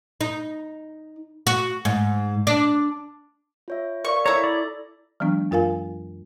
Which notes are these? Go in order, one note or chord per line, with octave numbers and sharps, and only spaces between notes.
D#4
F#4
G#2
D4
F4 C#5 E5
A#4 D5 F5 C#6
E4 A4 C#5 A#5
D5
E3 F#3 G#3 B3 D4
F#2 F4 A#4 F5 G#5